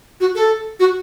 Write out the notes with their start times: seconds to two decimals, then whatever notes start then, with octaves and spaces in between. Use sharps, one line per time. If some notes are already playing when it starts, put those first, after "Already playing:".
0.20 F#4
0.35 A4
0.80 F#4